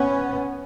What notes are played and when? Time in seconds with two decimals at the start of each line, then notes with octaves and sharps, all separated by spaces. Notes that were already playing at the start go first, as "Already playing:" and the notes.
Already playing: B3 C#4